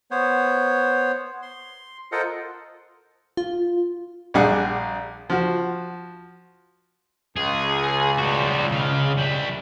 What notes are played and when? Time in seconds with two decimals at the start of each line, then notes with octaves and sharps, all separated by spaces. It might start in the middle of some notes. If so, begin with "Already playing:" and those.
0.11 B3 C5 C#5
1.42 C6
2.12 F4 A4 A#4 C5 D#5 F#5
3.37 F4
4.34 A#1 G3 G#4 F#5
5.30 F3 F#4
7.36 C#2 G#4
8.19 G3 F#4
8.72 C#3 F5
9.17 G3 E5